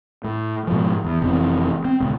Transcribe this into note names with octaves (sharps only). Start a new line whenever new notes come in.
A2
G#2 B2 F3
E2
F1 E3 C4
C4
D#1 C#2